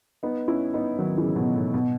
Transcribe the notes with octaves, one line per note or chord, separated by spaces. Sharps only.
B3 D#4
C#4 E4
B3 D#4
D#3 F#3
C#3 E3
B2
A2
B2